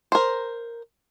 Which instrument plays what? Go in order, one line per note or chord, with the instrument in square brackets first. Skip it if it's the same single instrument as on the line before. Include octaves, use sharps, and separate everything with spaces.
[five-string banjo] A#4 C5